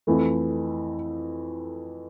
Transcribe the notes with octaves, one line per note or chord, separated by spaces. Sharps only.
F2 E3 A3